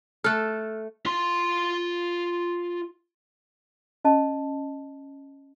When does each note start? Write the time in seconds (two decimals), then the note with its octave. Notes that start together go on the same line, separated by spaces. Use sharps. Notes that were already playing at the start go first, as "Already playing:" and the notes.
0.24 A3 A4 F6 F#6
1.05 F4 C6
4.05 C#4 D#5 A5